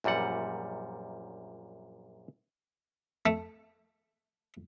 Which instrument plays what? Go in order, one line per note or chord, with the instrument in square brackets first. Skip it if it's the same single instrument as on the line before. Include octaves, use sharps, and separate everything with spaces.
[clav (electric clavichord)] A#1 F#2 A#2 G3 F#5
[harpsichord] A3